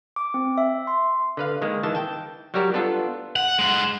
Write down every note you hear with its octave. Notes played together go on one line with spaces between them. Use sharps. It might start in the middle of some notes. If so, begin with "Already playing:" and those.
D6
C4
E5
C6
D3 B4 F5
D#3 G#3 A#3
D#3 E3 A5
G5 A5
F#3 G3 F#4 G4 A#4
B3 D4 F4 A4
F#5
G#3 F#5